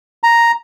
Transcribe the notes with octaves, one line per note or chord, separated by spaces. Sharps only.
A#5